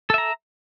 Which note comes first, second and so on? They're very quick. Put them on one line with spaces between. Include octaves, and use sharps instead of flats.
A4 E5 A#5